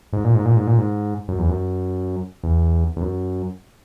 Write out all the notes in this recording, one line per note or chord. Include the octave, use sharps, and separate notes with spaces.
G#2
A#2
G#2
A#2
G#2
A#2
G#2
F#2
E2
F#2
E2
E2
F#2